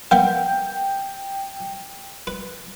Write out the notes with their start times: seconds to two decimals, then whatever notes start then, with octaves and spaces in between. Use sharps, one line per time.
0.11 A#3 B3 F5 G5
2.27 B4